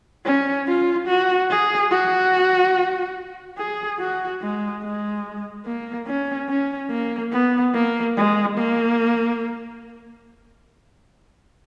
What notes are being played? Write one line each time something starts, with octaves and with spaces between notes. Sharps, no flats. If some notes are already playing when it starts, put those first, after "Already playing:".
C#4
F4
F#4
G#4
F#4
G#4
F#4
G#3
G#3
A#3
C#4
C#4
A#3
B3
A#3
G#3
A#3